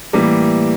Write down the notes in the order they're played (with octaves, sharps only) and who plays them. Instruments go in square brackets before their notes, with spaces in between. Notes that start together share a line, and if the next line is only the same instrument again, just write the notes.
[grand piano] A2 E3 G3 A#3 D6